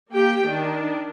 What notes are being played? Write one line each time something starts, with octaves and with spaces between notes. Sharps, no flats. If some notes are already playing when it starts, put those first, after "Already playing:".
A#3 G4 G5
D#3 D4